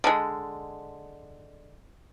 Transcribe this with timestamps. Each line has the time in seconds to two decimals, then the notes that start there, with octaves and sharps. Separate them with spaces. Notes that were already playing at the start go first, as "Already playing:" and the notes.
0.04 D3 G#3